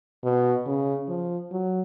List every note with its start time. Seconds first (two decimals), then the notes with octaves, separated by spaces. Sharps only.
0.24 B2
0.66 C#3
1.09 F3
1.51 F#3